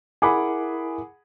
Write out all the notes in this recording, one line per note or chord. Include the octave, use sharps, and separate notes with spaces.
E4 G#4 A#4 F#5 G#5 B5 D6